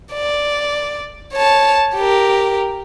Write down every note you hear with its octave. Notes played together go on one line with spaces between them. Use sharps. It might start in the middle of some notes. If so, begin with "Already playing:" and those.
D5
C#5 A5
G4 A#4